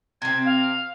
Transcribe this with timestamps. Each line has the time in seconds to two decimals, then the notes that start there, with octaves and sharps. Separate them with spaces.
0.22 C3 C4 G#6
0.45 F5